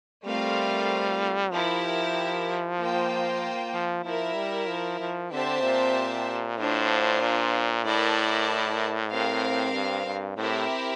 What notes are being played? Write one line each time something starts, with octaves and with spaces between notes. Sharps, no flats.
G3 A3 C4 F4 A#4 F5
F3 E4 G4 A#4
A#3 F4 C5 G5
F3
F3 E4 A#4 E5
G3
F3
F3
D3 C4 G4 C5 E5 A5
A#2
A2 D4 F4 C5
A#2
A2 E4 A#4 D5 A5
C4 G4 A#4 F5
G2
G2
A2 C4 E4 G4 A#4 E5